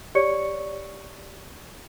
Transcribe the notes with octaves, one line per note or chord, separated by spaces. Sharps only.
G4 C#5 D5 C#6 C#7